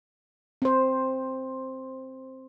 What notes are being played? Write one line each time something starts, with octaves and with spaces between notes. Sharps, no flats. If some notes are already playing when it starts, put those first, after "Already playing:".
C4 C5